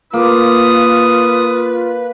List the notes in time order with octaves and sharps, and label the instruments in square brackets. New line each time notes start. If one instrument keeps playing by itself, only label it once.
[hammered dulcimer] A#3 [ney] F4 [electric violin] B4 [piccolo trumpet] D#6